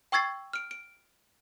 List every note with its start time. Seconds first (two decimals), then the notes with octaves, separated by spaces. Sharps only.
0.12 G5 C#6 E6 G#6 A6 C7
0.53 F6 D7
0.71 D7